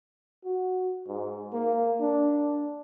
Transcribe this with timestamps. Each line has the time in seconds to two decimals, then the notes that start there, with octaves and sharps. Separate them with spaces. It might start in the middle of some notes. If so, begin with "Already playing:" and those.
0.45 F#4
1.08 G#2
1.53 A#3
2.00 D4